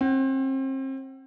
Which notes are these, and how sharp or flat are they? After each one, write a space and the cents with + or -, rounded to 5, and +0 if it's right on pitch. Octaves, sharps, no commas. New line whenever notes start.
C4 +35 F#5 +45